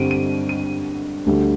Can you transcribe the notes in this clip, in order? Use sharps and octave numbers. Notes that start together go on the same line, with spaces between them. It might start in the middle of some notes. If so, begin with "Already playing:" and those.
Already playing: G2 D3 G3 C4 D7 D#7
D#7
D#7
D2 D3 G3 D4